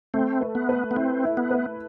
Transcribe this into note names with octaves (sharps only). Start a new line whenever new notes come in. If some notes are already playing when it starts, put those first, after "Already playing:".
A3 C4
B4
B3
B4
B3
C4 E4
E4
B3
B4